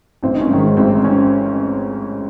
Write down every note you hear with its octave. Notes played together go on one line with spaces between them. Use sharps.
A1 C4
D#4
C#4
G#2 D#3
C#4
A1 C4
C#4